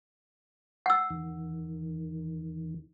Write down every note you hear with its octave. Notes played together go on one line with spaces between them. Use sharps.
F#5 E6
E2 D#3